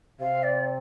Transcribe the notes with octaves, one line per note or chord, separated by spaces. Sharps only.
C3 F5
D5